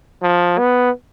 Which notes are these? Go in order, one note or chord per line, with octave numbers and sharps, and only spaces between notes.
F3
B3